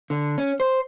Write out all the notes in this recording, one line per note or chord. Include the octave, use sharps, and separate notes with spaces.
D3
C#4
C5